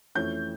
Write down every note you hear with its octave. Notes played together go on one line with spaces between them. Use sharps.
F2 E3 A3 C#4 G6